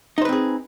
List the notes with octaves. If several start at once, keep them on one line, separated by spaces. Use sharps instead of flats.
C4 D#4 G#4 B4 C5